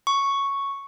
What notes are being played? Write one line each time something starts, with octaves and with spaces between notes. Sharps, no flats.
C#6